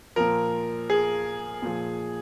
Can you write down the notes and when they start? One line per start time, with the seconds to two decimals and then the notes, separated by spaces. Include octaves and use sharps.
0.16 A#2 F3 A#4
0.90 G#4
1.62 A#2 F3